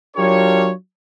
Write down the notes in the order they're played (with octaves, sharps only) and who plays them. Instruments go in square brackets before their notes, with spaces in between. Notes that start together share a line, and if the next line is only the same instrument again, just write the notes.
[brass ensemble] F#3 D4 F4 G4 A#4 C#5